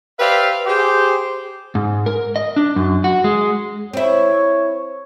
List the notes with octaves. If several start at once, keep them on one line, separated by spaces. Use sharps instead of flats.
G4 B4 C5 D5 E5 F5
G4 G#4 C5
G#2
A#4
D#5
D4
F#2
F#4
G#3
C4 E4 C#5